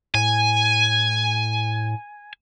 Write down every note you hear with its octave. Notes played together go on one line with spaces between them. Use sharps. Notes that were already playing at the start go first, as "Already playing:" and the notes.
A2 G#5